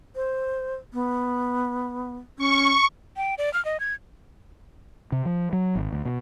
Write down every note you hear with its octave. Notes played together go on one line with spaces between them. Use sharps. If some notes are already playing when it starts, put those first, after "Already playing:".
C5
B3
C#4 C#6
G5
D5
F6
D#5
G#6
C3
F3
F#3
G#1
D2
B2